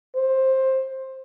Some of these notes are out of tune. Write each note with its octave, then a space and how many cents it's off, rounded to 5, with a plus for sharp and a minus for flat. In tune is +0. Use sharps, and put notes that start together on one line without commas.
C5 +15